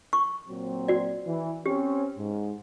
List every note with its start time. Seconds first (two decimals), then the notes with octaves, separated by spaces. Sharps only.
0.13 C#6
0.49 A#2 F#3 C4
0.88 F#4 D5
1.26 E3
1.66 C4 C#4 G4
2.17 G#2